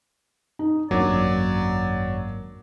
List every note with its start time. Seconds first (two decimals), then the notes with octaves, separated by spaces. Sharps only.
0.59 D#4
0.91 G#1 F#2 F#3 A#3 D4 D5